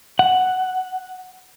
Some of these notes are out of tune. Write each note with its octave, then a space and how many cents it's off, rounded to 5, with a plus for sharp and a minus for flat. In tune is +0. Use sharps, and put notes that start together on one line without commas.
F#5 +5